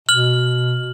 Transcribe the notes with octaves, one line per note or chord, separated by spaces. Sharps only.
B2 F6 F#7